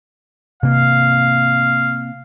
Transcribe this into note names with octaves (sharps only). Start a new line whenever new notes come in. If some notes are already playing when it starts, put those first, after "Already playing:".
C3 A#3 F5